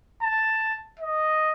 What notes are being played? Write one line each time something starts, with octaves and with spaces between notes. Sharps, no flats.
A5
D#5